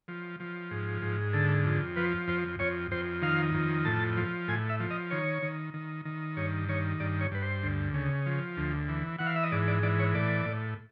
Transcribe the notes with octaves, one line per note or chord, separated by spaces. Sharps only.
F3
F3
G#2
G#2
D3 A4
F2
F3 B4
F2 C5
F2 C#5
F2 C5
D#3 F5
F2
A2 A5
F3
A2 G#5
E5
F3
D#5
D#3 C#5
D#3
D#3
D#3
G2 C#5
D#3 C#5
G2 D5
C#5
G2 B4
C5
D2
C#3
F3
D2
E3
E3 F#5
F5
E5
D#5
G#2 D5
D5
E3 D5
C#5
A2 D5
A2